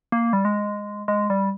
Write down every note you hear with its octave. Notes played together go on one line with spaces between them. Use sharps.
A#3
G3
G#3
G#3
G3